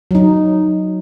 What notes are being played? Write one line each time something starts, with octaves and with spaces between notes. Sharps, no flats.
F#3 D#4